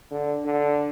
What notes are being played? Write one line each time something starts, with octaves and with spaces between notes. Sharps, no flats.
D3
D3